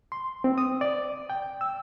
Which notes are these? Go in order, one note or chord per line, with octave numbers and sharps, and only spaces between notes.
C6
C4
D#6
D5
G5
E6